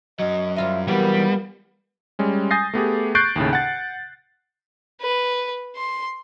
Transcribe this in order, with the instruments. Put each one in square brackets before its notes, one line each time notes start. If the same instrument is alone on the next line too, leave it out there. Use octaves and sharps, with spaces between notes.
[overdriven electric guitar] F#2 F#3 [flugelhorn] D#5
[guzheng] G3 F4 D#5 [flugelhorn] E5
[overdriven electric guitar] E3 F#3 [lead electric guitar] G3 [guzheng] A#3 [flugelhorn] B3
[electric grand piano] G3 G#3 C#4
G#5 D#6 G6 A6 A#6 C7
A3 B3 G4 G#4
C#6 F#6 G6 A6 C7 D7
D#2 A2 C#3
F#5 A6
[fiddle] B4
C6